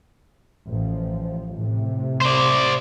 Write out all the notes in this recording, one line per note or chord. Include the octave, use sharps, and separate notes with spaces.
A1 F3
A2 C3
C5 D5